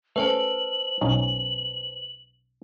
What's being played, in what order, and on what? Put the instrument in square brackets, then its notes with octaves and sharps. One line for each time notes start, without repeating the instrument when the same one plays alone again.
[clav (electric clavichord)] A3 C#4 [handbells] B4 C5 A5 [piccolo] F#7
[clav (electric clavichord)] B1 C#4 D#4